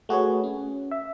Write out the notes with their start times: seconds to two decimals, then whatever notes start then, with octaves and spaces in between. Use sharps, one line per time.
0.09 A3 F#4 G#4 B4 C#5
0.44 C#4
0.91 E5